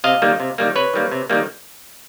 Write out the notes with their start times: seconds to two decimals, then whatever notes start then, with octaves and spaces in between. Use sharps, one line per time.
0.04 C3 D#5 F5
0.22 D#3 G3 A#3
0.40 C3
0.58 D#3 G3 A#3
0.76 C3 B4 C#5
0.94 D#3 G3 A#3
1.11 C3
1.30 D#3 G3 A#3